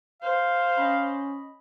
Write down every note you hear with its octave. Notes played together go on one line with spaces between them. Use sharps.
C5 F5
C#4 D#5 B5